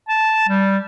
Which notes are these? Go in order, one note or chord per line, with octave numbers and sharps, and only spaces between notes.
A5
G3